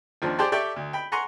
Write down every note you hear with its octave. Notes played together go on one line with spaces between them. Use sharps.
D#2 F3 D4
G4 G#4 C5 D5 G5 A5
G4 A4 D5 E5 G5 C#6
D2
G5 B5
F#5 G#5 A#5 C6 C#6